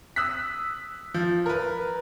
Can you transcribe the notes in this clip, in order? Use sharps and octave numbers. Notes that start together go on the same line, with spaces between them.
D#6 E6 F#6 B6
F3
A#4 B4